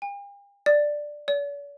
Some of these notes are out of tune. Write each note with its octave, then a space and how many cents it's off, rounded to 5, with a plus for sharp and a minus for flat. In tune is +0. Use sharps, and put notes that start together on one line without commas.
G5 +45
D5 +5
D5 -45